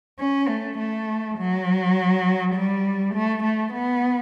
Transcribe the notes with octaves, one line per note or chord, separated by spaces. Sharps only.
C#4
A3
A3
F#3
G3
A3
A3
B3